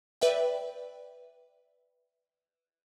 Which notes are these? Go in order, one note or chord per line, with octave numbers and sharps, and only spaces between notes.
B4 D5 E5 G5